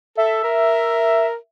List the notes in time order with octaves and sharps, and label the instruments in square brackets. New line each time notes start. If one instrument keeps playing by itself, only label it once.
[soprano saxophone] A4 [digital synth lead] E5
[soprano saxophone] A#4